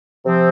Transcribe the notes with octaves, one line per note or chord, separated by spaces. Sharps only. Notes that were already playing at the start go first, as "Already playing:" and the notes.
C3 F3 C4